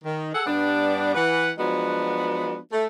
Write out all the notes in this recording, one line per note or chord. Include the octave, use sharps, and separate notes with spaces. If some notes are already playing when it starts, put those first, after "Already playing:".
D#3
G#4 A4 F#5
G2 G3 B3 D4
E3 B4 F#5
F3 F#3 G#3 B3 D4 F#4
A3